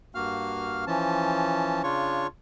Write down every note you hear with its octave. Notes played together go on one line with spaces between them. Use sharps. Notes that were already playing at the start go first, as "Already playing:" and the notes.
G2 A#3 F#4 F5 F6
E3 F3 C#4 A5
C#3 D4 F4 C#5 C#6